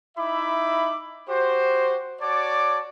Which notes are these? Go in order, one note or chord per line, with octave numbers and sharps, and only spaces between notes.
D#4 E4 E5 B5 D6
F#4 G4 C5
F#4 C#5 D5 A5 D6